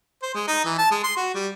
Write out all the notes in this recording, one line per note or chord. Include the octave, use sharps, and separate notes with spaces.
C5
G#3
D#4
E3
A5
G#3
C6
F#4
G3